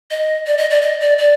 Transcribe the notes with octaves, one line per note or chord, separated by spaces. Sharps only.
D#5
D5
D#5
D5
D#5
D5
D5